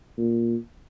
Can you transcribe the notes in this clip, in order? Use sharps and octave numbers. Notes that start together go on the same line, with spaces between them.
A#2